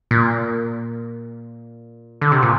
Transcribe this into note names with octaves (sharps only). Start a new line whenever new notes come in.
A#2
D3
C3
A#2